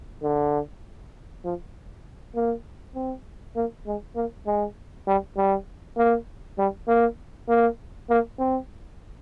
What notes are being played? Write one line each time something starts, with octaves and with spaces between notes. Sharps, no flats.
D3
F3
A#3
C4
A#3
G#3
A#3
G#3
G3
G3
A#3
G3
A#3
A#3
A#3
C4